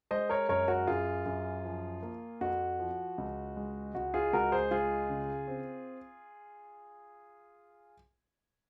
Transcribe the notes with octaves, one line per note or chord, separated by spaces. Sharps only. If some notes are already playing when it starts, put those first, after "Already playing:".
G#3 C5 D#5
A#4 C#5
F#2 A#4 C#5
F#4 A#4
F#2 F4 G#4
F#2
F3
A#3
F2 F#4
F3
C#2
G#3
C#2 F#4
F4 G#4
C#2 F#4 A#4
G#4 C5
G#3 F4 G#4
C#3
C4